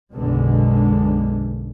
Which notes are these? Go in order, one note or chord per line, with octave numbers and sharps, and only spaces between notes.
B1 F#2 B2 D3 G#3